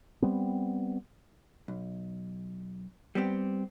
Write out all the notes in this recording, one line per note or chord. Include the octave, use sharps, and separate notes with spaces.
G3 B3 C4
B1
G3 B3 C4 G4